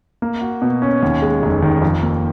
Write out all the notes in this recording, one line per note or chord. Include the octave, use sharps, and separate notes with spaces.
A#3
F#4
B2
C#4
D#2
G#3
F1
D#3
F2
A#3